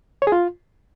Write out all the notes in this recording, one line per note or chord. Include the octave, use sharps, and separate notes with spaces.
C#5
G#4
F4